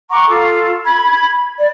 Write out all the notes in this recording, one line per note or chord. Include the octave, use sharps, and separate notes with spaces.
F#5 A#5 C#6 D6
F4 A4
B5 G#6
D5